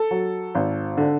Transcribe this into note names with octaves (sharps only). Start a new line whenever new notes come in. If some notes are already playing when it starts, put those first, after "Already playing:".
Already playing: A4
F#3
G#1
D3